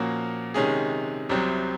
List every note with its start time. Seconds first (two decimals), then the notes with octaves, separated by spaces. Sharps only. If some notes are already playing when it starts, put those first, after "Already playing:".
Already playing: A#2 F3 A#3 C#4 F#4
0.54 C3 D#3 G#3 C#4 G#4
1.29 C2 C3 F#3 C4